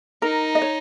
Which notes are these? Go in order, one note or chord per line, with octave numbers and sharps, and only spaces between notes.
D#4 A#4
D#5
C#5